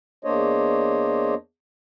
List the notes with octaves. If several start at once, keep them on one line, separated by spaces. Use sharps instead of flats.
E2 A#3 D4 C5 C#5 D#5